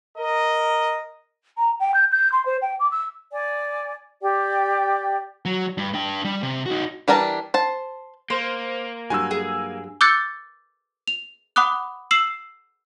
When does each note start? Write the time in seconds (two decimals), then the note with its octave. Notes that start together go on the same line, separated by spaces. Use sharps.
0.18 A#4 D#5
1.58 A#5
1.80 G5
1.94 G6
2.11 G6
2.32 C6
2.46 C5
2.62 G5
2.80 D6
2.92 E6
3.32 D5 G#5
4.22 G4 D5 G5
5.45 F#3
5.78 G2
5.94 D4 G5
6.25 G3
6.43 C3
6.66 D#4 F#4
7.08 E3 G3 D4 A#4 A5
7.54 C5 A5
8.30 A#3 C5
9.10 G2 F#3 G#5 E6
9.31 G#4
10.01 D6 E6 F#6 G6 A6 C#7
11.08 F7
11.56 F#5 B5 D6 D#6 F#6
12.11 E6 C7 E7 F#7